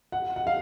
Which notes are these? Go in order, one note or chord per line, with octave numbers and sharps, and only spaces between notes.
F#5
F#5
F5